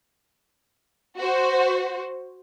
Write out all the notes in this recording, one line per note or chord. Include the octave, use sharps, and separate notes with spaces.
F#4 C5